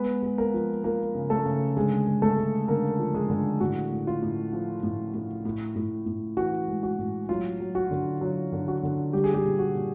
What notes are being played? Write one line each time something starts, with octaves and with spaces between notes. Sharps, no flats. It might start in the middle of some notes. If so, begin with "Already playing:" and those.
Already playing: G#3 B3 B4
G#3
A#3 A#4
F3
F3 A#3 A#4
C#3
A3 A4
C#3
D3 G#3 G#4
G#3
A3 A4
G#3
D3 A#3 A#4
F3
G#3 G#4
D3
A2 F#4
A2
F4
A2
F3
A2
A2
A2
A2
A2
E3 F#4
G#3
F#4
A2
F#3 F4
F#3
F#4
D3
F#3
D3
F#4
D3
G3 G4
G#4
G3 G4
A#2
F#4
A#2